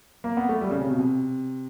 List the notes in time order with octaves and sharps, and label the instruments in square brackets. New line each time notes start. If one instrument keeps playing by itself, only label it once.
[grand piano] A#3
B3
A3
G3
C#3
C3
B2
C3